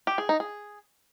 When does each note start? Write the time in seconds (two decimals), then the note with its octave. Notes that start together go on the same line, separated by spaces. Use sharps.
0.07 G4
0.18 G#4
0.29 D#4
0.40 G#4